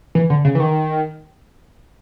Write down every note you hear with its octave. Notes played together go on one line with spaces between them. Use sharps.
E3
D3
C#3
E3
D#3